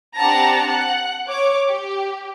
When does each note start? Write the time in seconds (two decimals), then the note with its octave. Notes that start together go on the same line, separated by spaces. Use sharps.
0.18 C4 D4 G4 F#5 A5 A#5
0.68 F#5 F#6
1.29 C#5 D6
1.69 G4